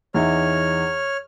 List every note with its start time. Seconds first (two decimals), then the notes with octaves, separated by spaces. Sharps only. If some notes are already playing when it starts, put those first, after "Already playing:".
0.14 E2 D#4 C#5 E5 F6